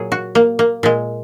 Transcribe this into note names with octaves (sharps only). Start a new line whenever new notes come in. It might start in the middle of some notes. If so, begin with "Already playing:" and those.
Already playing: A#2 F#3 G#4
F#4
A#3
A#3
A#2 G#3